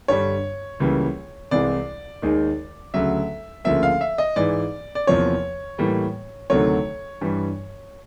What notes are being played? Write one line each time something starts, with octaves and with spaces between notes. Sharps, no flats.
G2 D3 G3 C#5
C#2 C#3 E3 G3 A#3
C2 C3 E3 G#3 D5
D#2 D#3 G#3
D2 C#3 F#3 E5
D2 C#3 F3 A#3 E5
F5
E5
D#5
G#2 E3 G#3 D5
D5
E2 C3 F3 A#3 C#5
A2 E3 G3 A#3
D2 C3 D#3 F#3 A3 C#5
G2 E3 G3